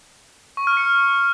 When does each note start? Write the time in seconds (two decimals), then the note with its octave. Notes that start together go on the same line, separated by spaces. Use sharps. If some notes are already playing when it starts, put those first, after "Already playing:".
0.57 C#6
0.67 F6
0.77 C#7